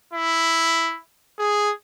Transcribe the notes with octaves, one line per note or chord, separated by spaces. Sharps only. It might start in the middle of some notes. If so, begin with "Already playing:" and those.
E4
G#4